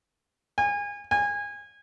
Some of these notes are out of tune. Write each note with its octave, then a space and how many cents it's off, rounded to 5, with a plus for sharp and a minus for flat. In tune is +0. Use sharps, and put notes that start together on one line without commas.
G#5 -30
G#5 -25